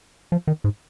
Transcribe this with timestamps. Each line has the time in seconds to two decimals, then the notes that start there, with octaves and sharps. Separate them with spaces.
0.32 F3
0.47 D#3
0.64 G#2